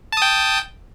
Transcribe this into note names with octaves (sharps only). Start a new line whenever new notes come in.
G5 A5 D#6